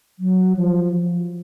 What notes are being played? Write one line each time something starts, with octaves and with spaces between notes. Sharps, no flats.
F#3
F3